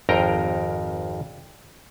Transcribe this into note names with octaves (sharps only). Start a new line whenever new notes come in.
G#1 F2 A#4 G5 A#5